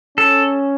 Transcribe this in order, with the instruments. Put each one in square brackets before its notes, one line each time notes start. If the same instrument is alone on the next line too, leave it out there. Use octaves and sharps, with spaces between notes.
[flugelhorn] C#4 [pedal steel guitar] A4